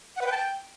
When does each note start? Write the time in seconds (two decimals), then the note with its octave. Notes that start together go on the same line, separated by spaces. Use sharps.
0.16 F#5
0.21 B4
0.27 G5
0.32 A5
0.37 G5